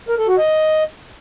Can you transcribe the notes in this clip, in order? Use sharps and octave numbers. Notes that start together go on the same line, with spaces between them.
A#4
A4
F#4
D#5